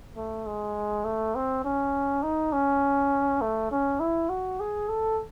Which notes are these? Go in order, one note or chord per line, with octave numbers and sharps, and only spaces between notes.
A3
G#3
A3
C4
C#4
D#4
C#4
A3
C#4
E4
F#4
G#4
A4